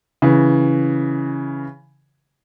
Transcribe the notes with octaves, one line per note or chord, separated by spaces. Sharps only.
C#3 E3